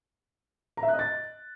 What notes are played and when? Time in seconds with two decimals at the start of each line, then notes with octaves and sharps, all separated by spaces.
0.77 A#5
0.83 E5
0.88 F#6
0.94 D#5
0.99 A6